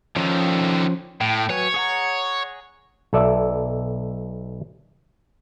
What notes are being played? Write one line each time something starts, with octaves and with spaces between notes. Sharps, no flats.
D3 D#3 F3 C#4 C5
A2 G5
F#3 B4 C#5 G#5
G#4 F#5 A#5
B1 A4 D5 E5 A5